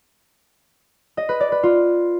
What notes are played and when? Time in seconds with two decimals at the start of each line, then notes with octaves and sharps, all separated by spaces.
1.17 D#5
1.29 B4
1.40 D5
1.52 B4
1.63 F4